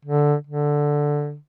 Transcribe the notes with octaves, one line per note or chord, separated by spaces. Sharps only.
D3
D3